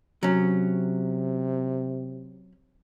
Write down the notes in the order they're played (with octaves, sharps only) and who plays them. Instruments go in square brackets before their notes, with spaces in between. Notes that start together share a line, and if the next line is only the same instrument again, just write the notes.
[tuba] C3 [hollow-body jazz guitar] F#3 C#4